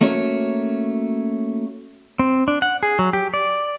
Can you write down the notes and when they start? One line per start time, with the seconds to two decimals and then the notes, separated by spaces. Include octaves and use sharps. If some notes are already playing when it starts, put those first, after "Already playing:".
0.01 A3 A#3 C#4 D4 F#4 C#5
2.19 C4
2.48 D4
2.62 F#5
2.83 G#4
2.99 F#3
3.13 G4
3.34 D5